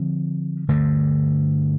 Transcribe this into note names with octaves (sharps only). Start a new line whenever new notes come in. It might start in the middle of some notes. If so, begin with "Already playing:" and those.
Already playing: D3 F3 C4
G2 D3 A3